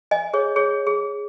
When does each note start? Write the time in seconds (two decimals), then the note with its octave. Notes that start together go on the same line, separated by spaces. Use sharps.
0.11 D#5 G#5
0.34 G#4 C#5
0.56 G#4 C#5
0.87 G#4